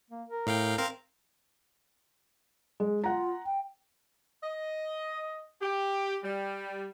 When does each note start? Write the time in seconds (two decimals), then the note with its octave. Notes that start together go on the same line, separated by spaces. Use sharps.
0.11 A#3
0.28 A#4
0.47 A2 F5 G5
0.78 C4 A#4 C5 F5
2.80 G#3
3.04 F4 F#5 A#5
3.46 G5
4.42 D#5
5.60 G4
6.23 G3